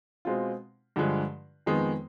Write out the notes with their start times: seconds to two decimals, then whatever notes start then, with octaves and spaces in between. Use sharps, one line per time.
0.25 B2 G#3 C4 F4
0.96 G2 D3 F3 G#3
1.66 F2 D#3 G#3 B3